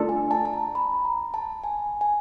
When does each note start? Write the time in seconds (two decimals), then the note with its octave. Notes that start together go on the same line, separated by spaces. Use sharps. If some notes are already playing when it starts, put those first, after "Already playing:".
Already playing: A3 D4 F4 A4
0.09 G#5
0.31 A5
0.45 A5
0.53 A#5
0.75 B5
1.05 A#5
1.34 A5
1.64 G#5
2.01 G#5